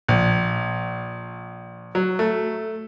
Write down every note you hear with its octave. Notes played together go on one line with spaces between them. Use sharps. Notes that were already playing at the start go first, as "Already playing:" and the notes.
A#1
F#3
A3